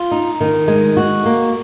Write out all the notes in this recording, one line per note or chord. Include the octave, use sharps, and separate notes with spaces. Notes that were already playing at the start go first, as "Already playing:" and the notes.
Already playing: F4
D#4
D#3
G#3
F#4
A#3